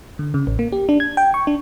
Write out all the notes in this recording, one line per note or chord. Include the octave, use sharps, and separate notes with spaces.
D3
C#3
A1
A#3
G4
D4
G#6
G5
C#6
D4